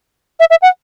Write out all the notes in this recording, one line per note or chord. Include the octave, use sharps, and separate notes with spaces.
E5
E5
F#5